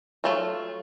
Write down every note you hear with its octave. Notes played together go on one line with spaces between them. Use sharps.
F#3 A3 F4